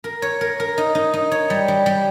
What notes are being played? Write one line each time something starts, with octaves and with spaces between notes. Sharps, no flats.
A#4
C#5
A#4
A#4
D#4
D#4
D#4
C#5
G3
G3
G3